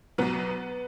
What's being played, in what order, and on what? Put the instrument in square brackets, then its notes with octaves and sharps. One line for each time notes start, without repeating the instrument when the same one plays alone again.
[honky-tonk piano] B1 B2 F#3 B3